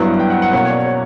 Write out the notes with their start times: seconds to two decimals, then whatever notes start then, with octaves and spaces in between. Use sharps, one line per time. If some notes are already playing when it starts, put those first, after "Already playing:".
Already playing: G2 F#3 B3 E4
0.20 G5
0.30 F#5
0.42 F#5
0.53 B2 A#3 C#4 F#5
0.65 C#5
0.70 D5
0.86 C#5